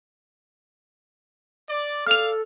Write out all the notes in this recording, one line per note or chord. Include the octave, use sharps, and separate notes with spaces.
D5
A4 D5 F5 F6 F7